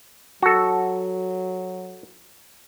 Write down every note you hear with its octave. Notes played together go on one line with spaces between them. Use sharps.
F#3 F#4 A4